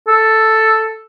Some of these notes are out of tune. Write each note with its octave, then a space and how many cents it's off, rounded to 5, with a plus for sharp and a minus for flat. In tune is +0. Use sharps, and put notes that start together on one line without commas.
A4 +5